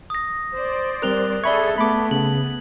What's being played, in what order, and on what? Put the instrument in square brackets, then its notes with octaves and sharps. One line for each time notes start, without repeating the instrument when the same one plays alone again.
[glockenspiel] D#6 A#6
[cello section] C5 D5
[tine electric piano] G3 C4 A#4 [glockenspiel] F#6 F7 G7
[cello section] G#4 A4 [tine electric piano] D5 B5 C#6 [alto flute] E5 [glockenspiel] G#6 G7
[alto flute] A3 [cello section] B3 [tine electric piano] B5 D6
[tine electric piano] C#3 [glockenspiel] F#7